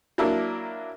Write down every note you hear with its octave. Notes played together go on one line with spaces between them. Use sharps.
F#3 A#3 D4 E4